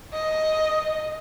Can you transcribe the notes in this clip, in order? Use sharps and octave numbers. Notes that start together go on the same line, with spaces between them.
D#5